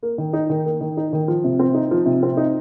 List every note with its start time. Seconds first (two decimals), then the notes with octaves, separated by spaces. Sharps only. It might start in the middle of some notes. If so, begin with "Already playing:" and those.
0.03 A#3
0.18 D#3
0.33 D#4
0.50 D#3
0.65 A#3
0.81 D#3
0.97 D#4
1.13 D#3
1.28 F3
1.44 C3
1.59 C4
1.74 D#4
1.91 F3
2.06 C3
2.23 C4
2.37 D#4